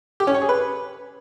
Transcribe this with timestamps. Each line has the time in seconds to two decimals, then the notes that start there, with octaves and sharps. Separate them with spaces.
0.20 G4
0.27 C#4
0.34 C#5
0.42 G#4
0.49 B4